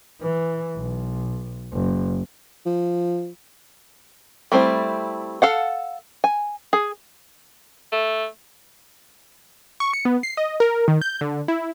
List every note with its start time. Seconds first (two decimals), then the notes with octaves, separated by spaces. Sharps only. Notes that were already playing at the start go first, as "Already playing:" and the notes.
0.21 E3
0.77 B1
1.72 F#1
2.66 F3
4.52 G3 A3 C4 D4 E4
5.42 A4 F5 F#5
6.24 G#5
6.73 G#4
7.92 A3
9.80 C#6
9.93 C#7
10.05 B3
10.23 C7
10.37 D#5
10.60 A#4
10.88 D#3
11.01 G6
11.21 D3
11.48 E4